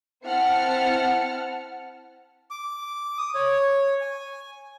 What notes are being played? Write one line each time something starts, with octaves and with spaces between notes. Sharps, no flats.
C4 E4 F#5 A5 F6 C#7
D6
D#6
C#5
G#5